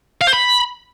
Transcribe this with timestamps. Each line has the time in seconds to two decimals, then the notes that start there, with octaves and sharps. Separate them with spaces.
0.21 F5
0.27 C5
0.33 B5